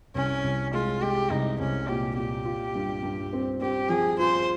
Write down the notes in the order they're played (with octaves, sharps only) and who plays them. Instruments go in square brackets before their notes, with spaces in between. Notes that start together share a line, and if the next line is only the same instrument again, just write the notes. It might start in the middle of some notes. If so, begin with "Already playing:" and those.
[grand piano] C2 [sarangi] C#4
[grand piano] C2
[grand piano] G#3 [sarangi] F4
[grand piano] G#3 [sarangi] G4
[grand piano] C2 [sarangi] D#4
[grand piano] C2 [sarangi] C#4
[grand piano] A#2 [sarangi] G4
[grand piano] A#2 [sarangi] G4
[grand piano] F4
G2
G2
C4
[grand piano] C4 [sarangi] G4
[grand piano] F3 [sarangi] G#4
[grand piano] F4 [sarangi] C5